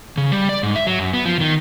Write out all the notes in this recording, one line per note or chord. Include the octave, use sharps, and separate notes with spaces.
C#3
G3
D5
G#2
E5
F#3
F#2
B3
F3
D#3